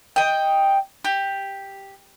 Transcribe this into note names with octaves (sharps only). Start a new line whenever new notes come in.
D#5 G5
G4